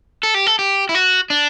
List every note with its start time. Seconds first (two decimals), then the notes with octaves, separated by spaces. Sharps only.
0.23 A4
0.35 G4
0.46 A4
0.59 G4
0.89 E4
0.95 F#4
1.30 D4